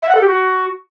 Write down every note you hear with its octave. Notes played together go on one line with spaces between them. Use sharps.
E5
F#5
A4
G4
F#4